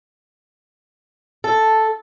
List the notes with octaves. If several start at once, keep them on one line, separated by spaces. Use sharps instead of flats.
A4